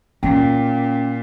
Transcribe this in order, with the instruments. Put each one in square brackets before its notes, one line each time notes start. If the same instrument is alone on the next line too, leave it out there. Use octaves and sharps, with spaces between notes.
[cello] A#2 [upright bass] C#4 [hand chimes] G5